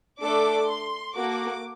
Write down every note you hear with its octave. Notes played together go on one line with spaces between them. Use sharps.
A3 D4 A4 D6
C6
A#3 F#4 A4 D6